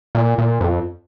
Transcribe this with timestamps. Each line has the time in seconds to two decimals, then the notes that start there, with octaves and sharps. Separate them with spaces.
0.15 A#2
0.38 A#2
0.61 F2